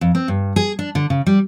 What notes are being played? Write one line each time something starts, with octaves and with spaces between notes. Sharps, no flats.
F2
C4
G2
G#4
D4
D3
C#3
G3